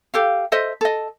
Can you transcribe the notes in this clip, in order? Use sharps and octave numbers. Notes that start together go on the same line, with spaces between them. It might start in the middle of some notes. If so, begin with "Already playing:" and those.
G4 A4 F5
A4 C5 D#5 E5
A4 D#5